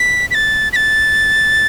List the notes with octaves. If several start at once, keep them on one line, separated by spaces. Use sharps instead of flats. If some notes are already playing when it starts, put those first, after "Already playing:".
Already playing: B6
B6
A6
B6
A6